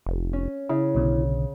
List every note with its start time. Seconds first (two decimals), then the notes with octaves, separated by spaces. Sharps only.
0.06 F1
0.33 C#4
0.69 C#3 E4
0.95 B1 B2 D3